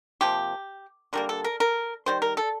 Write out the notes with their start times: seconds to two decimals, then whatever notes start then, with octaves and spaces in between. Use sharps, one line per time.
0.21 C3 F3 A#3 G4
1.13 D3 G3 A#3 A#4
1.29 A4
1.44 A#4
1.60 A#4
2.06 D#3 G3 C5
2.22 A#4
2.37 A4